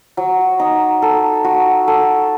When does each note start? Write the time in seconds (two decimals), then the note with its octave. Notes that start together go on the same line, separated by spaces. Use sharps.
0.17 F#3
0.59 D#4
1.02 A4
1.44 F#4
1.88 A4